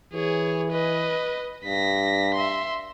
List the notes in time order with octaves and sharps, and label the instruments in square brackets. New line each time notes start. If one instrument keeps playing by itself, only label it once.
[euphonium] E3 [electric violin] G#4 C#5
[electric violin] B4 D#5
[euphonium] G2 [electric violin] A#6 B6
[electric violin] E5 C6